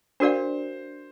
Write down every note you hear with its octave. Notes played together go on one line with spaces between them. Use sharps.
D4 F#4 A#4 C5 D5 F5